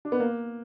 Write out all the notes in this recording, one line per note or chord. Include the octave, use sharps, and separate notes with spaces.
D4
B3
A#3